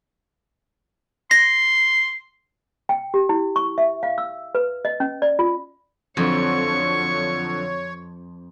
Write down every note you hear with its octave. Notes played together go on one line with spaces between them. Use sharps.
C6 A#6
G5
G4
E4
C#6
E5
F5
E6
B4
D#5
C#4
D5
F4
F2 D3 F3 F#3 C#5 C#6